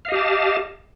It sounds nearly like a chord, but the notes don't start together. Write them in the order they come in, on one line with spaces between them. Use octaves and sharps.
F5 D#5 G4 A5